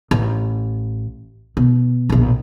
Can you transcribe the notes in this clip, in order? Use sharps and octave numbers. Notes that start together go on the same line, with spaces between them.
A1
B2
E1 A#1